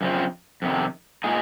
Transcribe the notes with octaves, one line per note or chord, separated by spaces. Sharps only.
F#2 C#3 F3 C4
F2 C3 D#3
A#2 G#3 D#4 G#4